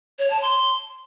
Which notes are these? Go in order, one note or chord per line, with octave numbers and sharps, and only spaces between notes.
C#5
A5
C6